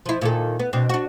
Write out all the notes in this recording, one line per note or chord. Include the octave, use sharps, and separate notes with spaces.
F3 E4
A#2 D#3 A4
B3
B2 C4 D4
D4 F#4